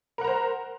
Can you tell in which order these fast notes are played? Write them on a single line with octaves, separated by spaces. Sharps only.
A#4 F#5 A#5 C5